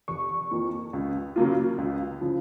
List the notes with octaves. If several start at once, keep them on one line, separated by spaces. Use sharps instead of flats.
F1 C#6
F2 F3 A#3
C#2
C#3 F#3 A#3 F4
C#2
C#3 F3